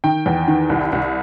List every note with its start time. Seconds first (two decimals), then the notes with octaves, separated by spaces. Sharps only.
0.04 D#3 G5
0.26 E2
0.48 D#3
0.70 C2
0.92 C2